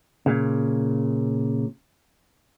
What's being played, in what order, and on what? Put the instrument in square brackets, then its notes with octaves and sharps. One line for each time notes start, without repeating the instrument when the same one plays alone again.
[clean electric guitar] A#2 C#3